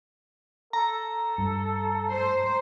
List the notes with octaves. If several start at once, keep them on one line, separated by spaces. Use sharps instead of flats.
A4 A#5
G2
C5